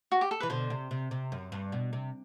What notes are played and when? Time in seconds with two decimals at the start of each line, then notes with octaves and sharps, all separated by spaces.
0.12 F#4
0.21 G4
0.31 A4
0.40 E3 B4
0.50 B2 D3 C5
0.70 C3
0.91 C3
1.11 C3
1.32 F#2
1.52 G2
1.72 B2
1.93 C3